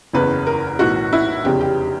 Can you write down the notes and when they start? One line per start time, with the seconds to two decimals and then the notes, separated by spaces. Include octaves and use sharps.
0.13 F#1 E2 C#3 E3 B4
0.47 A#4
0.79 B1 A2 E3 F#4
1.13 E4
1.44 F1 E2 C#3 G4
1.61 G4